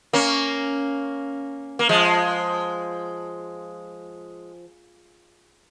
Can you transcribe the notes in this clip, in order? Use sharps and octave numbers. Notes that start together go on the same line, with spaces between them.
A#3 C#4
A#3
F3 G#3